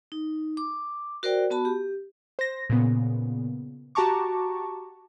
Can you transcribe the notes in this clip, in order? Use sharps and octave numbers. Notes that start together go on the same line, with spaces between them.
D#4
D6
F#4 A#4 C5 D5 G5
B3 F#4 A5 B5
G4
C5 A#6
A#2 C#3 B3
F#4 G4 A5 A#5 C#6 D6